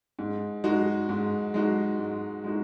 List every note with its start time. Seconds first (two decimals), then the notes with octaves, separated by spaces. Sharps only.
0.19 G#2
0.64 G#3 D#4 F#4
1.09 G#2
1.54 G#3 D#4 F#4
1.99 G#2
2.44 G#3 D#4 F#4